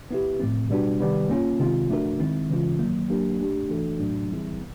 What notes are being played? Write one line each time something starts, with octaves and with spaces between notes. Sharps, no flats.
B3 E4 G4
A2 F3 A3 C4
B2 G3 B3 D4 F#4
C3 D#3 G3 B3
A#3 C#4 F4
C3 D#3 G#3 C4 F4
F3 A3 D4 F#4 A#4
D#3 G#3 C4 E4
C#3 E3 G#3 C#4 F4
D#3 F#3 A#3
F#3 A#3 D4 G4 A#4
A3 D4 G4
E3 A3 D4 F#4 A4
A2 F#3 A3 D4 F#4
E3 G3 C4 E4 G#4
B3